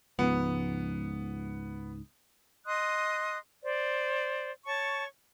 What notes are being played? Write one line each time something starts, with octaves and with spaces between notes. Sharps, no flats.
C#2 G#2 F3 B3
D#5 C6 D#6 F#6
C5 D5
C#5 A5 C#6